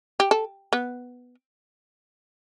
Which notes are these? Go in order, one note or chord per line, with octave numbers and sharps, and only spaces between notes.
G4
A4
B3